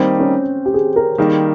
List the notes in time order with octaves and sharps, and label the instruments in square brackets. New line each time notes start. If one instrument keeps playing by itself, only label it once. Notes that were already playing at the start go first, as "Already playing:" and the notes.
Already playing: [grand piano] D#3 G3 A#3 D#4 [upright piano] C4
[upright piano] C#4
G4
G#4
A#4
[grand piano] D#3 G3 A#3 D#4 [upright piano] G#4